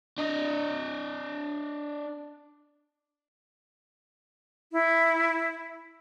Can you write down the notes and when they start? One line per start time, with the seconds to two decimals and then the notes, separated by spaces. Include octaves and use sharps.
0.18 D4 D#5
4.73 E4